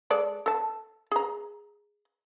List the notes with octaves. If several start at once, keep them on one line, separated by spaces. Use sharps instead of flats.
G#3 A4 D5
A4 A5
G#4 A#5